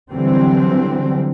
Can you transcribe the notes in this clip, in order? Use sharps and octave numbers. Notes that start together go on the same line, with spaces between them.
D3 E3 F#3 G3 C4